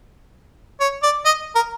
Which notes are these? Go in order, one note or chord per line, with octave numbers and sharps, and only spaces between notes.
C#5
D5
D#5
A#4